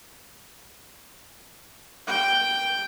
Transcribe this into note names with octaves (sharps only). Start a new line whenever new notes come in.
G5